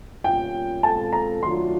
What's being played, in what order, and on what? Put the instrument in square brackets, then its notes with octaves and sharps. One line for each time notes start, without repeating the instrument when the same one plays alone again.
[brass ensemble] B2 G3 A#3 C#4 F4 [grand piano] G5
[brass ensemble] B2 G#3 C4 F4 A4 [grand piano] A5
[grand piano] A#5
[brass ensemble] D#3 F#3 A3 D4 F4 [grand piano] C6